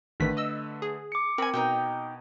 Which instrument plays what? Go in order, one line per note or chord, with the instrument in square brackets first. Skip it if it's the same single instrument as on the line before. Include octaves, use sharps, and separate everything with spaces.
[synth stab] A1 D#3 B6 [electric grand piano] D3 A3 B4
[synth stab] D#5 E6
G#4
[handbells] D6 C#7
[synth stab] C4 [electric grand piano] A#4 [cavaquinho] G#5 B5
[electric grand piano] B2 [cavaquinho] D#4 A#4 G5